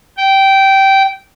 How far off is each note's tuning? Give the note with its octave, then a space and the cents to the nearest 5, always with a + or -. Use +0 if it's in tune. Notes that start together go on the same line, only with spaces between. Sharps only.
G5 -15